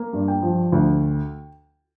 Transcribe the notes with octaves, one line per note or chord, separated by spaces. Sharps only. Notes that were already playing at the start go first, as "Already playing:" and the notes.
Already playing: A#3
G2
G5
F3
D2